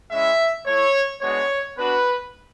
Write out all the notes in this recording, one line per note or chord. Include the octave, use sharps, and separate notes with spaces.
G#3 C#4 E4 E5
A3 E4 C#5
G#3 B3 D4 F#4 C#5
B3 D4 F#4 B4